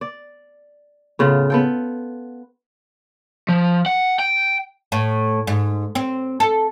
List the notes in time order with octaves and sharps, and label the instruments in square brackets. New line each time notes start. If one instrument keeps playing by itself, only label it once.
[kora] D5
A2 C#3 B3 F4
B3 A4 G5
[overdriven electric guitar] F3
F#5
G5
[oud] A2
G#2
C4
A4